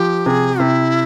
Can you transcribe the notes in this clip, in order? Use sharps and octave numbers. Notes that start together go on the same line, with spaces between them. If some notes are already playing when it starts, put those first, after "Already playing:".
Already playing: F3 G4
C3 G#4
C3 E4